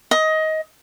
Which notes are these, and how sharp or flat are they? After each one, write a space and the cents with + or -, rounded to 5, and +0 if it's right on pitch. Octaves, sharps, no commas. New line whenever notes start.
D#5 +20